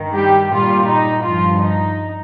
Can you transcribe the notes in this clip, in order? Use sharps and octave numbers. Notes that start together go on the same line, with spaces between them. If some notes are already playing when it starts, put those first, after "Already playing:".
Already playing: G2 D#3
G3 G4
A#2 G3 F4
D#4
G2 F3 F4
D#4